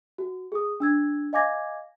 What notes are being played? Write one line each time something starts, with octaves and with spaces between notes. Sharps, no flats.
F#4
G#4 D#6
D4 E6 G#6
D#5 F5 G#5 D6 G#6 A#6